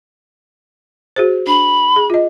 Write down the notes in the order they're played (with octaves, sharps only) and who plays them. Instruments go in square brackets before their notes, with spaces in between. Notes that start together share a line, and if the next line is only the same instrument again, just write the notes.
[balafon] F#4 G#4 C5
[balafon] D4 [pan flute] B5
[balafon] G#4
F4 D#5